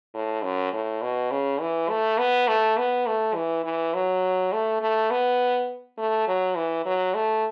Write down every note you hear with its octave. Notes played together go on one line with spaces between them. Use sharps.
A2
F#2
A2
B2
C#3
E3
A3
B3
A3
B3
A3
E3
E3
F#3
A3
A3
B3
A3
F#3
E3
F#3
A3